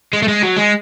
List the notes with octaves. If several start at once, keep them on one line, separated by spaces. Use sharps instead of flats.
G#3
A3
G#3
F#3
G#3